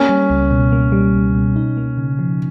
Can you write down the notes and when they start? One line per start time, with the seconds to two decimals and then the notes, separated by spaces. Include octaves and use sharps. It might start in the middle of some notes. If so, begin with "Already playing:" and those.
Already playing: A#3 C#4
0.09 G3
0.30 C#2
0.51 B2
0.72 A#3
0.92 G3
1.14 C#2
1.34 B2
1.56 D#4
1.77 A#3
1.98 C#3
2.19 F3